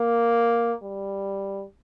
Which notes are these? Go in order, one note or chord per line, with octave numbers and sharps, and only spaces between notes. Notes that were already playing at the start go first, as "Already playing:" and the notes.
Already playing: A#3
G3